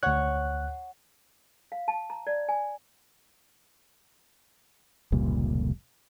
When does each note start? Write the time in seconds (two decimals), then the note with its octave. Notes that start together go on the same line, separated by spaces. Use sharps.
0.03 D2 C#5 F#5 F#6
1.72 F5
1.88 A5
2.10 A#5
2.27 D5
2.49 G#5
5.12 F1 C#2 A#2 G3